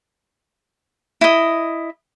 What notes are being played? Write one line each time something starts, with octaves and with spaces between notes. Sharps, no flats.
E4 D#5